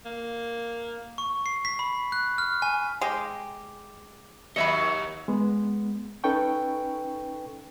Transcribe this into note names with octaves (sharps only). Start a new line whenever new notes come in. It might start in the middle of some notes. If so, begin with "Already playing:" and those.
A#3
C#6
C7
B6
B5
F#6
F6
G#5
G#3 G4
D#2 F#3 D#5 E5 B5 C#7
G#3 B3
C#4 D#4 A4 B4 G5 C#6